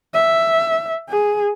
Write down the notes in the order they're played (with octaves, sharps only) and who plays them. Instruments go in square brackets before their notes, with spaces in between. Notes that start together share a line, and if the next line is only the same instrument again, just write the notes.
[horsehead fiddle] E5
G#4